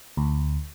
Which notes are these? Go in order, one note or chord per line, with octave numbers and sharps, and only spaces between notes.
D2